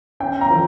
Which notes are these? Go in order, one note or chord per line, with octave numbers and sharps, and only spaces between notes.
C#4 G5
A#5
F3